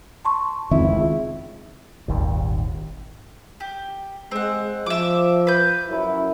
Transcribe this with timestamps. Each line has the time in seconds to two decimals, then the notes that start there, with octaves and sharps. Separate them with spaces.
0.25 A5 C6 C#6
0.71 F1 C#2 D#3 C4 E4
2.08 D#1 G#1 D#2
3.60 G4
4.31 G#3 C4 F#5
4.86 F3 E5 D6
5.47 B4 G6
5.88 F#2 E4